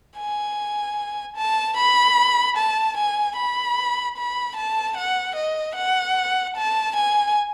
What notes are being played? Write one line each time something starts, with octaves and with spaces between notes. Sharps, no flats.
G#5
A5
B5
A5
G#5
B5
B5
A5
F#5
D#5
F#5
A5
G#5